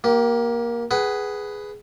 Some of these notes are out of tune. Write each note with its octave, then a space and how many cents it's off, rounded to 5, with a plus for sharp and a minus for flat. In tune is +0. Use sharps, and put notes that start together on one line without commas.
A#3 +15 G4 -20
G#4 +0 B4 +0 F#5 +35